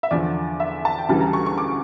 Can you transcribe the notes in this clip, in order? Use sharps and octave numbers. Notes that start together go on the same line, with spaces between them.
E5
E2 D3 F3 D5
E5
A5
G5
D2 C#3 E3 G3 A5
A#5
C#6
C#6
D6